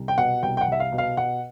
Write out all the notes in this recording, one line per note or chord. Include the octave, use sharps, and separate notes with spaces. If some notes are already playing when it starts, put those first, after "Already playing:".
Already playing: C2
G5
B2 F#5
C2 G5
G5
F#5
C2 E5
F5
B2
F5
B2 F#5